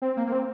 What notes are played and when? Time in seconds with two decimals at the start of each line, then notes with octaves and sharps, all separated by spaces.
0.02 C4
0.17 A#3
0.27 A#3
0.32 C4